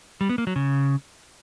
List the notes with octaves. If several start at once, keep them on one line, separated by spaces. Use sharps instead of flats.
G3
B3
A#3
F#3
C#3